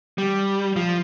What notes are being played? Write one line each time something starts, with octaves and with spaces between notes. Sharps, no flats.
G3
F3